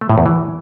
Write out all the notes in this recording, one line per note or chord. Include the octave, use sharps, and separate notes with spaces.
A3
A2
E2
E3